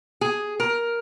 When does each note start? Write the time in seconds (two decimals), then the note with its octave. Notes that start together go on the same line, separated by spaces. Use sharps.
0.21 G#4
0.60 A#4